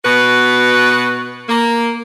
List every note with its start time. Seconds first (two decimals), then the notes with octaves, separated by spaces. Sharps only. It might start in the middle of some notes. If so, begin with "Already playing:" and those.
0.04 B2 F#4 B4
1.49 A#3